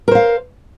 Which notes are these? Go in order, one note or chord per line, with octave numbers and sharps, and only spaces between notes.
A#4 C5 F5